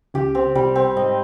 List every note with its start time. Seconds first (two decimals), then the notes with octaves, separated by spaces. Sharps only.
0.14 C#2 C#3 G4
0.35 C4
0.55 C2 C3 G3
0.76 C4
0.96 G#2 D#5